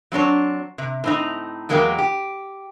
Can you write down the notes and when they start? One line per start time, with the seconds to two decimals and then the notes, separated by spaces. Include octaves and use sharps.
0.12 F#3 C4 D4 C#5
0.78 C3
1.04 A2 C4 D#4
1.69 E2 F#3 G#3 A#3 D#4 G4
1.98 G4